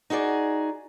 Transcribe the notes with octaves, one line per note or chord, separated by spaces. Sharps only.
D#4 F#4 G#4 D5